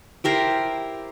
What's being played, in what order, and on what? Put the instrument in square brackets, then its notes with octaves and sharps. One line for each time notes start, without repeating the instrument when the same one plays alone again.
[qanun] E4 G4 A#4 C5